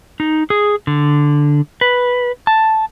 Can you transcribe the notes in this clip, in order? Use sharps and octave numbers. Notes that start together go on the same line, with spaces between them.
D#4
G#4
D3
B4
A5